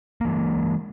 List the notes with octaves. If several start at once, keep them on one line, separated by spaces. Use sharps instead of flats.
E3 G#3 A#3